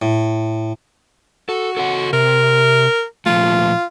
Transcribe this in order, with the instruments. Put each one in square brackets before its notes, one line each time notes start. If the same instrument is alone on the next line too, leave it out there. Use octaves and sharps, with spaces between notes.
[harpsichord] A2
[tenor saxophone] F#4 [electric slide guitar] A4
[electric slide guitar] A4 C#5 F#5
[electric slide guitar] C3 [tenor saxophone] A#4
[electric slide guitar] A#2 F3 A3 [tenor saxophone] F4